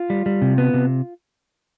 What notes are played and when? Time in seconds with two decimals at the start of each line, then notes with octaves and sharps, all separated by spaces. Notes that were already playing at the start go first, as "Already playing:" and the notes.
Already playing: F4
0.10 G3
0.26 G3
0.42 C3
0.58 B3
0.74 C3